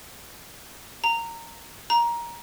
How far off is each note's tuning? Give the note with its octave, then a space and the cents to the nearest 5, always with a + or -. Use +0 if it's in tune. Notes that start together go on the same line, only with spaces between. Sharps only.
A#5 -15
A#5 +15